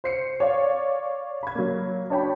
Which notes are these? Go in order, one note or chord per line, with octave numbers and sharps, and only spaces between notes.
C5 C7 C#7
C#5 D5 F5
B5 G#6
F#3 A#3
D4 C#5 G5 B5